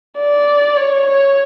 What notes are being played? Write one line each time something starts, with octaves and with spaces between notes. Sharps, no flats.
D5
C#5
C#5